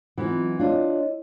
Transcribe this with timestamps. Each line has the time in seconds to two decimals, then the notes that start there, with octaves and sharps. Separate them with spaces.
0.18 E3 F#3 B3 C4 D#4 F4
0.59 D4 E4 F4 C#5 D#5